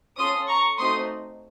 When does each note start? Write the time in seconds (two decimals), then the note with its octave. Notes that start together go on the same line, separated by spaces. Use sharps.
0.18 C#4 F4 A4 C6 D#6
0.48 A#5 C#6
0.78 A3 C4 D#4 F#4 C6 D#6